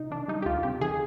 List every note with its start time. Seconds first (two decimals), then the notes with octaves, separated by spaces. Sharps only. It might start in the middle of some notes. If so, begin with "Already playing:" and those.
Already playing: C3 D#4
0.11 D#3 D4
0.28 G3 D#4
0.42 G4
0.45 D2 F4
0.63 C3 G4
0.81 D#3 G#4